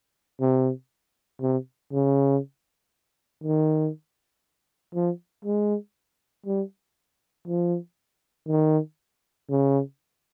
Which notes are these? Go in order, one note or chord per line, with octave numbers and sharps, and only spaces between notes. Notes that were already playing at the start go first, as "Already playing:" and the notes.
C3
C3
C#3
D#3
F3
G#3
G3
F3
D#3
C#3